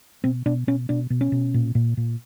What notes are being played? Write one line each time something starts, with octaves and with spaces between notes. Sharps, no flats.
B2 C4
B2 D4
B2 C#4
B2 D4
B2
C#4
B2
A#2
A#2
A#2